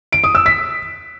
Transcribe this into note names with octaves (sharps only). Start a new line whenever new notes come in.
D7
D#6
E6
B6